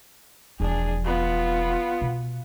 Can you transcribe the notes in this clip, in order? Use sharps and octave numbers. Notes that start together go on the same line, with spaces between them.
E1 F3 D4 G#4
B3 F4
B2